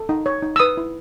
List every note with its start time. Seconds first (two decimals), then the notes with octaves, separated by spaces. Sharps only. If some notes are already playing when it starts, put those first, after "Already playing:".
Already playing: A4
0.09 D#4
0.26 C#5
0.42 D#4
0.56 E6
0.59 B4 D#6
0.77 E4